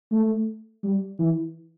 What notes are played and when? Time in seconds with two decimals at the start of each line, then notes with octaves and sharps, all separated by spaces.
0.11 A3
0.84 G3
1.19 E3